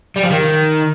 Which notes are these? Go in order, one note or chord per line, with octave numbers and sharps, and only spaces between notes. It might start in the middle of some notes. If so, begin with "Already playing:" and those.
G3
F3
D#3